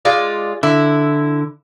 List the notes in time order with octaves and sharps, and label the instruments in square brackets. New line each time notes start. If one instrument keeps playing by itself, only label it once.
[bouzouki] G#3 F4 D5
[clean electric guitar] D3 [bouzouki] E4